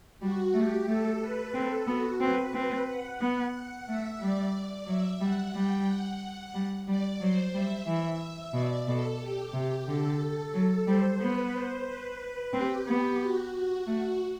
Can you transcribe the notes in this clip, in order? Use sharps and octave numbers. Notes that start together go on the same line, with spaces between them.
G3 F#4
A3 G4
A3 A4
B4
C4 A4
B3 F#4
C4 B4
C4
F#5
B3
A3 E5
G3 D5
F#3 E5
G3 F#5
G3 G5
F#5
G3
G3 D5
F#3 C5
G3 E5
E3
B2 D5
B2 A4
G4
C3
D3 A4
F#3
G3 C5
B3 B4
C5
B4
C4 G4
B3
F#4
F#4
A3 F#4